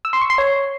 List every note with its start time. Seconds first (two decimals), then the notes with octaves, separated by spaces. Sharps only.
0.05 E6
0.13 C6
0.21 C#6
0.30 C6
0.38 C#5